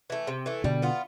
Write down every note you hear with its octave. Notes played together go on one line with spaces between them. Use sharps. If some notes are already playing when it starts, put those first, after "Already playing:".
E3 A3
C3
E3 A3
B2 D3 G3
B3 F4